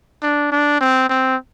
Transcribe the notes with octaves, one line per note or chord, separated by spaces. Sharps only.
D4
D4
C4
C4